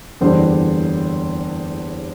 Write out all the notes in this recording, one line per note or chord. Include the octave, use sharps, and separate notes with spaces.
F#1 E2 D3 G3 C5